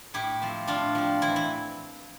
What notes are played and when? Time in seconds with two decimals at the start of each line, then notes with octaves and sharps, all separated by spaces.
0.14 A2 E4 G4
0.42 F3 C4
0.67 A2 D4 F4
0.95 F3 C4
1.22 E3 E4
1.36 E4